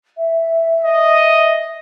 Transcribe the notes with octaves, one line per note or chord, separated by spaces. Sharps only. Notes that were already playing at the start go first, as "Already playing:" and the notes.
E5
D#5